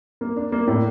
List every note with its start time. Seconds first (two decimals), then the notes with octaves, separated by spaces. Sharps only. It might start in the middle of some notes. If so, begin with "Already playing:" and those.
0.21 A#3
0.37 D4
0.52 A#3
0.67 A2